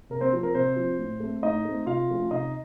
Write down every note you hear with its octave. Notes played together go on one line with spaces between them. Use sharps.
C3 A#4
C4 C5
F3 C4
A#4
C3 C4 C5
F3 C4
A2
A3 C4
A2 D#4 D#5
A3 C4
C3 F4 F5
F3 A3 C#4
C3 D#4 D#5